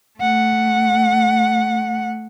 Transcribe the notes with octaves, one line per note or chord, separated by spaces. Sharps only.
A3 F#5